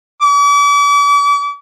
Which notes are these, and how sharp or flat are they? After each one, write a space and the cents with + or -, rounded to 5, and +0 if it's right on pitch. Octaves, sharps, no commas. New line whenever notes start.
D6 -40